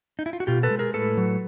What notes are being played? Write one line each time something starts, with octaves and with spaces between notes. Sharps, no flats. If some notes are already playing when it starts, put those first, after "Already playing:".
D#4
E4
F4
F#4
B2 F4 G4
A4 B4
G#3
G#4 A#4
A2 A4 B4
F#3